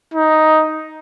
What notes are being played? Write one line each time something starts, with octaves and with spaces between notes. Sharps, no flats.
D#4